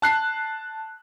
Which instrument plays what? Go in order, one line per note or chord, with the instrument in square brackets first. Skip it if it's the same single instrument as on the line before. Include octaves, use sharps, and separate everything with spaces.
[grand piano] A5 F#6 C7